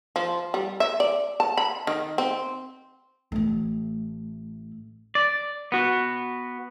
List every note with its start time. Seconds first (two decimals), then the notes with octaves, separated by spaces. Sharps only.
0.16 F3
0.54 G3
0.80 E5
1.00 D5
1.40 A5
1.57 B5
1.87 D#3
2.18 C4
3.32 A1 A3
5.15 D5
5.72 B3 F#4